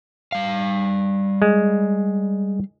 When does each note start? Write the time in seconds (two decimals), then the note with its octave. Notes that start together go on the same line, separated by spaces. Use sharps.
0.32 G3 F5
1.42 G#3